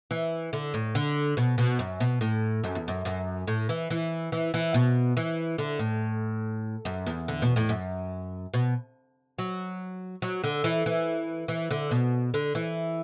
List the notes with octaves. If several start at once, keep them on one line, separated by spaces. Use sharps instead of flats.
E3
D3
A2
D3
B2
B2
F#2
B2
A2
F#2
E2
F#2
F#2
A2
E3
E3
E3
E3
B2
E3
D3
A2
F#2
E2
D3
B2
A2
F#2
B2
F#3
F#3
D3
E3
E3
E3
D3
B2
D3
E3